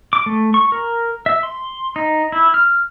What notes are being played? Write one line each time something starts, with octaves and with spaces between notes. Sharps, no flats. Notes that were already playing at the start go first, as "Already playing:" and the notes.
D6
A3
C#6
A#4
E5
C6
D#4
E4
F6